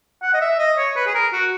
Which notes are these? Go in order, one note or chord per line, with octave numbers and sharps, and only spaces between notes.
F#5
D#5
E5
D#5
C#5
B4
G#4
A#4
F#4